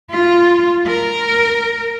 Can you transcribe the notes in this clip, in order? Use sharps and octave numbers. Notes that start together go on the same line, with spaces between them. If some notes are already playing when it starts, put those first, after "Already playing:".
F4
A#4